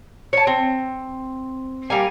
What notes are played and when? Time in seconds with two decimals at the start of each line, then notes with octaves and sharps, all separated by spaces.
0.33 C#5 A5
0.47 C4
1.90 G3 A#3 G#5